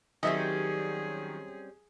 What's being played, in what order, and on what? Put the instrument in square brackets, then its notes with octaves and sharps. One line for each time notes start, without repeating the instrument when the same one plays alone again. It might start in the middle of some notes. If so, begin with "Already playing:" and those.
[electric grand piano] D#3 F#3 [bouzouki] G3 C4 C#4 [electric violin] G#4 [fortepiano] D#5 E5